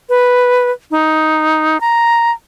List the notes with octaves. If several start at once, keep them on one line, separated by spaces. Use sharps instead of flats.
B4
D#4
A#5